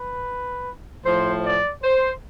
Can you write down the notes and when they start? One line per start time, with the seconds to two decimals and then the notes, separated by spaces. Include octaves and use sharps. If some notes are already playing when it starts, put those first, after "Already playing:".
Already playing: B4
1.04 A2 F3 C5
1.44 D5
1.83 C5